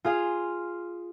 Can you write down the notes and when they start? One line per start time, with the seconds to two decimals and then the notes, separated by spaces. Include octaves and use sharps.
0.04 F4 G#4 F5